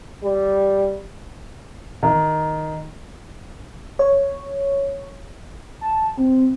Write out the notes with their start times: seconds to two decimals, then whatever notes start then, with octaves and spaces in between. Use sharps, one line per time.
0.24 G3
2.03 D#3
3.99 C#5
5.81 A5
6.17 C4